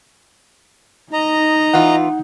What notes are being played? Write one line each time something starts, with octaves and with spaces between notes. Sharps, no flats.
D#4 D#5 A#5
E3 F4 F#5